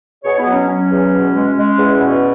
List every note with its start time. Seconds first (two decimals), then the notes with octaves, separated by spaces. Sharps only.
0.24 B2 G#4 C#5
0.38 B3 E4
0.46 F#3
0.53 C#4
0.68 F#3 C#4
0.91 E2
1.13 B2
1.34 G#3
1.56 G#3
1.77 E2
2.00 B2